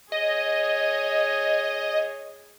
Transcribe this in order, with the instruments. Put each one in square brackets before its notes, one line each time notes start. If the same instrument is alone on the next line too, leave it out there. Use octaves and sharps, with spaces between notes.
[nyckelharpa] G#4 C#5 [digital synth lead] D#5